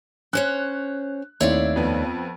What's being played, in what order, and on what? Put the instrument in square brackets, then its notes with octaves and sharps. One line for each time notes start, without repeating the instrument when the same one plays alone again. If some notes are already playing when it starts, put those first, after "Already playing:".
[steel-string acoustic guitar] C#4 C5 C#5 [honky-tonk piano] F#6
[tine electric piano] D#2 A3 D#4 [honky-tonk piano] C4 E4 [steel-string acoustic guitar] C#5 D5 F5
[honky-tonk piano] F2 B3